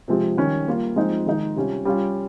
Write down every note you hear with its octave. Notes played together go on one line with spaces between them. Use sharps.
C3 F3 G#3 C4
D#3 G3 C#4
G3 A#3 F4
F3 G#3 C4 D#4
D#3 G#3 D#4
C3 G3 C#4 F4
G3 C#4 F4